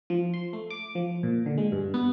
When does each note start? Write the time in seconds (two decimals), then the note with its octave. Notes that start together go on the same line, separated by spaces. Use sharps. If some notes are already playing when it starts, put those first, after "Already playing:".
0.10 F3
0.34 C6
0.53 A3
0.70 D6
0.95 F3
1.23 A#2
1.46 D3
1.58 G#3
1.72 G2
1.94 B3